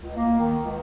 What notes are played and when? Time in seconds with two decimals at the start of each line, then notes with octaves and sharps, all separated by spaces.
0.02 C#2
0.16 A#3
0.40 D#3
0.62 C#2